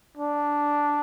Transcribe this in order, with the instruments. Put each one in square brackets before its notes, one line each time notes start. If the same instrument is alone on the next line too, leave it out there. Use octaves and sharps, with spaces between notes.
[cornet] D4